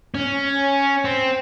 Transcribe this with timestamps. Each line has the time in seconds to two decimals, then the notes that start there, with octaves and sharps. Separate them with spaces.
0.14 C#4
1.05 C4